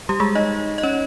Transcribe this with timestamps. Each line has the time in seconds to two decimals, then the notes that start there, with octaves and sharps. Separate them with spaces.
0.09 G3 G4
0.20 G#3 G#4
0.35 D#4 D#5
0.78 D#5
0.83 C#4 C#5